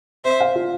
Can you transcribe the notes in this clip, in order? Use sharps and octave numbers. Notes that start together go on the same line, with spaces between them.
C4 C5 E5
F5
F4